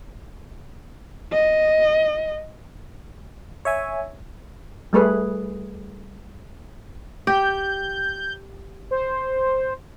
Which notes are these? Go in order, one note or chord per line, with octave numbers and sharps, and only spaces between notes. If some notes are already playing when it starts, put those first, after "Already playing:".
D#5
C#5 E5 G#5
G3 A3 G#4 B4
G4 G6
C5